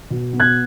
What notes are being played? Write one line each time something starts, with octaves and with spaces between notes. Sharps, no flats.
B2
B3
F#6 G#6